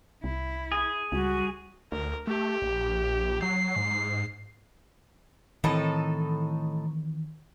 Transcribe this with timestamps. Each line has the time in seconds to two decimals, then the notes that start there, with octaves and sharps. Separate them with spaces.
0.24 C2 E4
0.72 G#4
1.12 C#2 G3 F#4
1.92 D2 A#4
2.27 A3 G4
2.62 A#1
3.42 F#3 C7
3.76 G#2
5.64 A2 D#3 E3 C4 D#4 A4